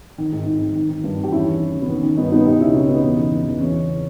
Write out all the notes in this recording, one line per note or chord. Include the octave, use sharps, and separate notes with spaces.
D#3
G#2
G#2
D#3
D#3
D#3
G2
D#3
G4
E2 C#4 E4
E3
E3
C#3
B3
D#3 C#4
D#3 C#4
G2 B3 D#4
G2 B3 D#4
B2 D#4 G4
C#2 C#4 E4
C#2 C#4
B2 B3 D#4
E2
C#3
E2
E2
E2 C#4
C#3
C#3